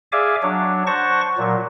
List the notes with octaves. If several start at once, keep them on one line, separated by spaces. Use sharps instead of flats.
G#4 D5 E5 F5 G#5 D6
F#3 D4 C#5
C5 F#5 A5 C#6 A#6
A#2 F#3